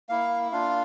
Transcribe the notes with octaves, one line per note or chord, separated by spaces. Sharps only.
A#3 E4 F5
A#3 D4 F4 F5